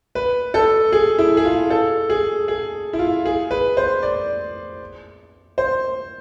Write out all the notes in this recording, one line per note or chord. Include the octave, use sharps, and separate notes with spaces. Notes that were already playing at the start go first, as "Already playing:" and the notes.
B4
A4
G#4
E4
G#4
F4
A4
G#4
G#4
E4
F4
G#4
B4
C5
D5
C5